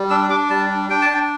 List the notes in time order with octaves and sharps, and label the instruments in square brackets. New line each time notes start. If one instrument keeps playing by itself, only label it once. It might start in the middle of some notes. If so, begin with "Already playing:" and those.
Already playing: [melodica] G3
D4 E6
D4 D6
G3 A5
D4
D4 G5
A5
D4
G5